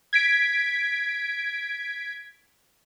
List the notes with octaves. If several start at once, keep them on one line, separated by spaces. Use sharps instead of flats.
G#6 B6 D7